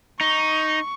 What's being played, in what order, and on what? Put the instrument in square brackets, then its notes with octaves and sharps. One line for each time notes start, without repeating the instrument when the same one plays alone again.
[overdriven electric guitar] D#4 [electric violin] C#6